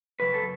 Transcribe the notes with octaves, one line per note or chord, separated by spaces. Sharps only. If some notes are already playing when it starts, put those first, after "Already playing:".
F#2 C#3 F#3 B4
A4